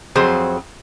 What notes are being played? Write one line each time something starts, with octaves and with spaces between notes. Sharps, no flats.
F2 F3 F#3 C4 G#4 C5